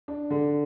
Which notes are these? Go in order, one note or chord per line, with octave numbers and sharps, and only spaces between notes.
D4
D3